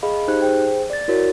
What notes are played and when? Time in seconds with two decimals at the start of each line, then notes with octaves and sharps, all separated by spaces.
0.03 G#4 D#5 F5 B5
0.28 D#4 G4 C5 F#6
0.42 G#4 C5 G5
0.90 D5 A6
1.08 E4 F#4 A#4 C#5